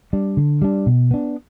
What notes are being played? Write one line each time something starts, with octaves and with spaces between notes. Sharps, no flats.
G3 D4
D3
G3 D4
B2
B3 D4